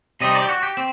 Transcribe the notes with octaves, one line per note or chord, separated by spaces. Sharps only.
C3 G3 C4 D#4 D#5
D5
G4
F#4
G4
C4